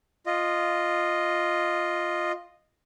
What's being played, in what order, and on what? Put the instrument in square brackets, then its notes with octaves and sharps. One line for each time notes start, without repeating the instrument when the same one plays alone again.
[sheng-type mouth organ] F4 D#5